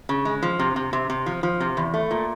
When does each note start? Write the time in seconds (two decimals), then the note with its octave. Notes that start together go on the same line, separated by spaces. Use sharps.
0.09 C#3
0.25 G#3
0.43 F3
0.59 C3
0.76 C3
0.93 C3
1.10 C3
1.26 F3
1.43 F3
1.60 C3
1.77 E2
1.94 A3
2.11 A#2